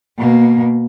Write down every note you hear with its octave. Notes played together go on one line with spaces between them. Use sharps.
B2 A#3